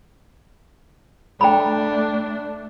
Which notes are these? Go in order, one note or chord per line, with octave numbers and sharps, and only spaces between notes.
A3 D4 G5 A#5 B5